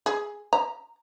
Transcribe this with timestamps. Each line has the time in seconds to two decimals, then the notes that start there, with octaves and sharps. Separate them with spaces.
0.06 G#4
0.53 A#5